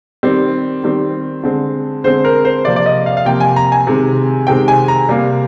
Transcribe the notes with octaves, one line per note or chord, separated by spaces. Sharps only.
D#3 G3 C4
D#3 G3 C4
D3 G#3 C4
D3 G#3 C4 C5
A#4
C5
C3 F3 A#3 D5
D5
D#5
F5
F5
C3 F3 A#3 G5
G#5
A#5
G#5
C3 D#3 G#3 C4
C3 D#3 G#3 C4 G5
G#5
A#5
C3 G3 A#3